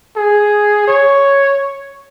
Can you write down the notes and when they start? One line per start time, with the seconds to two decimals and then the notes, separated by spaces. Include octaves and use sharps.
0.16 G#4
0.87 C#5